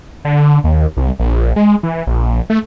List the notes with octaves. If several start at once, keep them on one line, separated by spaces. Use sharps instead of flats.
D3
D#2
C2
A#1
G#3
E3
A#1
A3